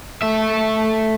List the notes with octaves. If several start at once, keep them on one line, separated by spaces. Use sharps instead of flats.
A3 E5